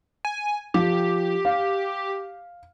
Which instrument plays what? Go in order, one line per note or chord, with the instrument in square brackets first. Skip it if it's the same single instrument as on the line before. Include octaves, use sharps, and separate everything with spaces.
[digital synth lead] G#5
[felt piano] F3 [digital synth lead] G4
[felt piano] F5